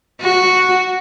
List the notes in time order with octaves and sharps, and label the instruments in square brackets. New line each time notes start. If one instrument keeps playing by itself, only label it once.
[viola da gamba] F#4